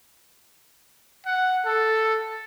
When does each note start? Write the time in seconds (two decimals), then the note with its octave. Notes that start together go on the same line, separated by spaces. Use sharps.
1.26 F#5
1.65 A4